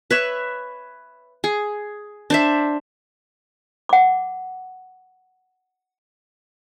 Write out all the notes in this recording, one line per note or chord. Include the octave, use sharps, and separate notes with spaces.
B4 C#5 E5
G#4
D4 C5 E5
F#5 D6